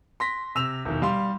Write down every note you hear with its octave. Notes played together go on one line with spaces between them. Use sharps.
C6 A#6 B6
C3 E6 E7 F7
E1 D#3
G3 F5 C6